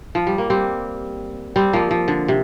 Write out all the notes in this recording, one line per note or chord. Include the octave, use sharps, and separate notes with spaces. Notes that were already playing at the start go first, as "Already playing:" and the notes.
F3
G3
A#3
G3 C4
G3 C4
F3 A#3
F3
D3
C3